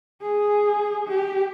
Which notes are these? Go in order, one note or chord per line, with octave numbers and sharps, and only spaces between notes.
G#4
G4